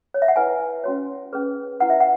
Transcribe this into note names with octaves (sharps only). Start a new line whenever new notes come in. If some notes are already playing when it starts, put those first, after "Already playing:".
C#5
E5
F#5
E4 B4 G#5
C#4 F#4 C#5
C#4 G#4 B4
E4 B4 F#5
E5
F#5